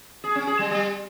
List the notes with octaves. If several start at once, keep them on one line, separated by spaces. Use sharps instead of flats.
G#4
C#4
G#4
G3
G3